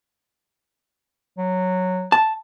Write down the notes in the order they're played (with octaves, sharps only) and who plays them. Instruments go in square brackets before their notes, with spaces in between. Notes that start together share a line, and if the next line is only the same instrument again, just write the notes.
[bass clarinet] F#3
[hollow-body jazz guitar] A5